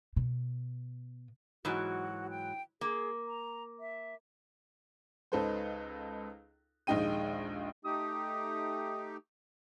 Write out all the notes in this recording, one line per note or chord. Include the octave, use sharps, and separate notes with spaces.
B2
G#2 E3 F#3 F#4
G5
A#3 G#4
A#5
E5
C#2 D#4 A4 B4 C5
A#1 D#2 G#3 D#4 G5 D#7
A3 D#4 G4 D#6